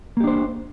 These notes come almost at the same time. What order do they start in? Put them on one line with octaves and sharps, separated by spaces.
A#3 G4 D4 C5